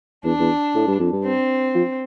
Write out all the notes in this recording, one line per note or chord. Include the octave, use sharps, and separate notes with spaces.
E2 D4
E2
A2
G2
F2
G2
C4
F3